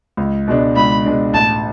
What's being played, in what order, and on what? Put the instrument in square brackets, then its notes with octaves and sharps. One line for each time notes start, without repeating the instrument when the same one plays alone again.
[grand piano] C#2
B2 G#3 D4
[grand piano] C#2 [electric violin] B5
[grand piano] B2 G#3 D4
[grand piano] A1 [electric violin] A5